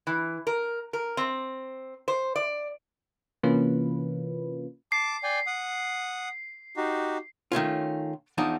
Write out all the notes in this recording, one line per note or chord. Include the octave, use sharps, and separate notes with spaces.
E3
A#4
A#4
C4
C5
D5
C3 E3 A#3 C#4 F4 B4
A5 D6 C7
D5 G5 G#5
F#5 D#6
D#4 F#4 G4
D#3 A3 C#4 F4
E2 F3 D4 D#4